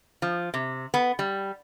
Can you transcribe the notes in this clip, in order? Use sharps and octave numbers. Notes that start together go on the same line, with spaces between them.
F3
C3
B3
G3